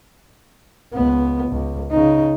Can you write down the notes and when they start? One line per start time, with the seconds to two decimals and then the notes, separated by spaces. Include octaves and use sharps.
0.93 C#2 B3
1.52 C#2
1.91 C#3 D#4